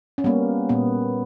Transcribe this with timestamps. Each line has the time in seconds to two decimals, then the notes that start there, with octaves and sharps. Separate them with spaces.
0.18 C#4
0.24 G3 A#3 B3
0.69 A#2 B3